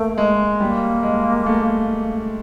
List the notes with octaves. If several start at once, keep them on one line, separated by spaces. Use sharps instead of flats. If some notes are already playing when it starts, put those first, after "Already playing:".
Already playing: A3 A#3
G#3
G3 A#3
G#3
A3